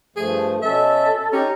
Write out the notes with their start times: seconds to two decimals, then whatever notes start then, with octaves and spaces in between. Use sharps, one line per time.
0.16 G2 F3 A3 G#4
0.62 B2 C#4 A4 E5
1.32 C#4 D#4 G4 A#5